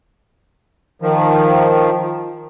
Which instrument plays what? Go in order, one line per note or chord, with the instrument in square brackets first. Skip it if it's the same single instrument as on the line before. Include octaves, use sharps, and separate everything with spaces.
[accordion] D#3 F3